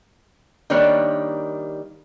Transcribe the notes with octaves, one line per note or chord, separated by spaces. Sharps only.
D#3 G3 A#3 D4 C#5